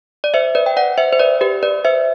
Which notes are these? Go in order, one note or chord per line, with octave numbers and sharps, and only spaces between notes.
D5
C5 E5
B4 D5
G5
D5 F#5
C5 E5
C5
B4 D5
G4 B4
B4 D5
C5 E5